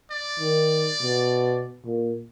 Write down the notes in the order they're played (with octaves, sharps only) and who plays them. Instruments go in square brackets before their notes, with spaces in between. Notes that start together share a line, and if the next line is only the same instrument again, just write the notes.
[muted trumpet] D5
[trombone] D#3
B2
A#2